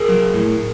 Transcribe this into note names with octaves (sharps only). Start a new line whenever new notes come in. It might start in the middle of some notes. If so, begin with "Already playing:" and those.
Already playing: G#4 A#4
F#3
A2